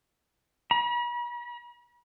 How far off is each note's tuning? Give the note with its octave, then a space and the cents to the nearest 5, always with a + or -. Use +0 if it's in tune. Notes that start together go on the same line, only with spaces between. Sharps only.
B5 -45